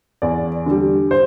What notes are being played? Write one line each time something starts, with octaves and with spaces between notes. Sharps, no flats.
E2 D5
D3 G3
C5